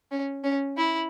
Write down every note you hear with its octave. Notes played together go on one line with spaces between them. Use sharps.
C#4
C#4
E4